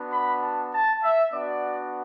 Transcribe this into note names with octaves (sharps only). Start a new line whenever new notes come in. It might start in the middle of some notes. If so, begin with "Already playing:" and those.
Already playing: B3 D4 F#4
B5
A5
A5
E5
B3 D4 F#4 D5